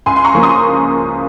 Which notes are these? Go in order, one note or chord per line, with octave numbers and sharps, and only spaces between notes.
C#2 G#5 C6
C6
A#5 C#6
C#3 F3 A#3
C6 D#6